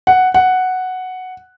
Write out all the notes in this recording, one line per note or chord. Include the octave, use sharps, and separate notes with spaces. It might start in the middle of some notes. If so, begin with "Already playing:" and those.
F#5
F#5